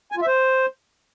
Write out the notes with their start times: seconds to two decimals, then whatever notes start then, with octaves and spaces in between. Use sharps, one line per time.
0.12 G#5
0.17 F4
0.22 E5
0.27 C5